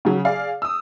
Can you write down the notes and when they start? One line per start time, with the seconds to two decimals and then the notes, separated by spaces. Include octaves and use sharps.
0.05 C#3 F#3
0.25 G#4 D5 F5
0.62 D#6 E6